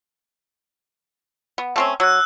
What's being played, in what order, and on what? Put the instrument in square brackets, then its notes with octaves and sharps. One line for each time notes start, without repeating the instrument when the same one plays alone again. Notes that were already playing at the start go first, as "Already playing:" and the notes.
[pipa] B3
A3 C4 C#4
[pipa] F#3 [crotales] E6 F#6